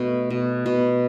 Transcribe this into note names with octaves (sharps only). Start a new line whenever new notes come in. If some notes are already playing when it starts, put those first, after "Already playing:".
Already playing: B2 A3
B2
B2